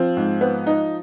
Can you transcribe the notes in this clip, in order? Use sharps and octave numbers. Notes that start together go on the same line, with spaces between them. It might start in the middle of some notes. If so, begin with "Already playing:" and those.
Already playing: F3 C4 F4
G#2
B3
D#4